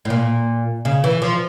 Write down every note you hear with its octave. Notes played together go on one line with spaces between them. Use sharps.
A2
A#2
C#3
E3
F3